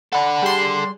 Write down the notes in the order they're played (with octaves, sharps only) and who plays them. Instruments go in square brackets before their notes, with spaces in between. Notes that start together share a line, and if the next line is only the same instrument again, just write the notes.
[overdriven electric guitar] A4 D5 [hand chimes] F#5 B5
[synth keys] G3 C6 [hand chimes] G#4